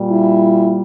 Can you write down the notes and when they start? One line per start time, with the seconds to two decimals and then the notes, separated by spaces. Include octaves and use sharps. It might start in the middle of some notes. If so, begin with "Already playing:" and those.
Already playing: A#2 G3
0.12 E4